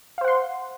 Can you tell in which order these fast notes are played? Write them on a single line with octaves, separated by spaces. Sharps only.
F5 C5 F#5 C6